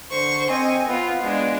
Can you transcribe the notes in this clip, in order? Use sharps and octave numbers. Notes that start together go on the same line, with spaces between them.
D3 C5 C#6
C4 D#5 G#5
B3 F4
G#3 D4